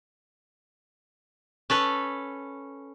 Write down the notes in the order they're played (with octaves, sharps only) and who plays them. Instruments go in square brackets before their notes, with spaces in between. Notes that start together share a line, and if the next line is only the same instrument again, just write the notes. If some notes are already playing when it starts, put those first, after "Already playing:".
[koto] C#4 A4 B4